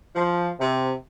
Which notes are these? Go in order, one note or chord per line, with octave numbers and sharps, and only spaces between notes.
F3
C3